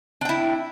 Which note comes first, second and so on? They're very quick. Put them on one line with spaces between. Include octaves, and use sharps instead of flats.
D4 G5 E4